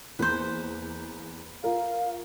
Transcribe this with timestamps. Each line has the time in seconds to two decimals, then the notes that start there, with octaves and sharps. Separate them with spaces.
0.19 E2 A#3 B4 C5
1.64 F4 A#4 F5